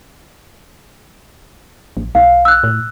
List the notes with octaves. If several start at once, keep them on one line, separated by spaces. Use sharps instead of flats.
A1
B1 F5
E6 F#6
A2